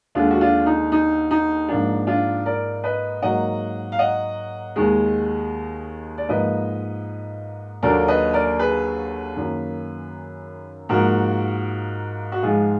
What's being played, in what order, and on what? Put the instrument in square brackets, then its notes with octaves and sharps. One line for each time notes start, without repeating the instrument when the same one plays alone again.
[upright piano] D#2 D3 G#3 D4 F4
F#4
D4 F4
D#4
D#4
D#4
G#2 F3 A#3 D4
D4 F4
A#4 D5
B4 D#5
G#2 F#3 A#3 D#5 F#5
F5
D#5 F#5
D#2 D#3 G#3
D5
G#2 F3 A#3 B4 D#5
D#2 D3 F#3 A#3 A#4 D5
B4 D#5
A#4 D5
G#4 B4
F#2 D#3 A#3
G#2 F3 A#3 F#4 A#4
F#4
G#2 F3 G#3 F4 G#4